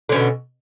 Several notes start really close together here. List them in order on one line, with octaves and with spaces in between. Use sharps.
D3 C#4 B2